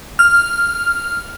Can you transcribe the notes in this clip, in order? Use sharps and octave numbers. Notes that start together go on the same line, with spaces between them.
F6